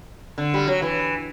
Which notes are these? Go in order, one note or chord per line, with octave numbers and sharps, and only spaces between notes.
D3
G3
F#3
E3